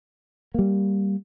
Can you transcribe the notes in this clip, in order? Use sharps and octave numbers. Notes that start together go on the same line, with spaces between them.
G3 A#3